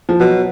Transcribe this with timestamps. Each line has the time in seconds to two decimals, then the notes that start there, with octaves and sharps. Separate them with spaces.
0.09 F3
0.20 B2 F#3